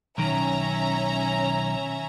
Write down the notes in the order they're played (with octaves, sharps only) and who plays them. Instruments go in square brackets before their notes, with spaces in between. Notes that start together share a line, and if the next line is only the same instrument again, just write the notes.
[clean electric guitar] B1 D#3 [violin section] C#4 E5 A#5